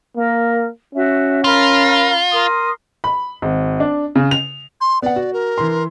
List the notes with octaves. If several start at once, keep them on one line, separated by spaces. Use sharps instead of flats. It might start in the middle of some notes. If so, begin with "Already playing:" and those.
A#3 A#4
C#4 F#4 E5
F4 A#4 F5 B5
A#4 C6 D#6
B5
G#1
D4
C#3
F7
C6
B3 D5 F#5
F#4
A#4
E3 C6